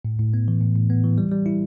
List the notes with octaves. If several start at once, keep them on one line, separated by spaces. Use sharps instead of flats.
A2
A2
B3
E3
A2
A2
B3
E3
G3
G3
E4